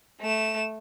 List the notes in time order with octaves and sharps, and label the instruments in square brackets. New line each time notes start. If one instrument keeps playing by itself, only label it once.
[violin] A3 E7